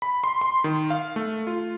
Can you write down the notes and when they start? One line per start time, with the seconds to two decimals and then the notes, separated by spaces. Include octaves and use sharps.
0.02 B5
0.24 C6
0.41 C6
0.64 D#3
0.90 F5
1.16 A3
1.47 F4